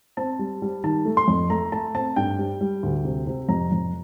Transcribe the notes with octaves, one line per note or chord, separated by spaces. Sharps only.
C4 A5
G3
G3
D#3 A5
A3
C6
F2
A3 A#5
A3 A5
C4 A5
G2 G5
G3
G3
D2
C3
C3
F2 A#5
F2